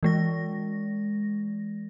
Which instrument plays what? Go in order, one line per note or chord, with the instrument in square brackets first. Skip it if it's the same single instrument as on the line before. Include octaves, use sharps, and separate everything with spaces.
[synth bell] E3 G#3 A#6